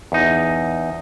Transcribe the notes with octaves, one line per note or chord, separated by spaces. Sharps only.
E2 D#4